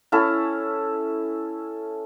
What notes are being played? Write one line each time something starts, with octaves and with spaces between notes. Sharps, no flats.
C#4 E4 A4